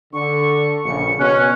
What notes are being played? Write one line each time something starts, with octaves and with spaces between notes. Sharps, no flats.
D3 C#6
A#1 C#3 C#7
B2 C#4 F#6